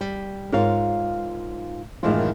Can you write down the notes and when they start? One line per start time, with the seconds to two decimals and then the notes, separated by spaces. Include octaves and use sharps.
0.01 G3
0.52 G#2 F4 A#4 C#5 F5
2.03 F#2 A2 D#3 E3 G#3 F4